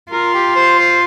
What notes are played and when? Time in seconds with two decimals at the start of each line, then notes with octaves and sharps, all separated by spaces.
0.11 F4 A#4
0.34 G4
0.56 C5
0.79 C5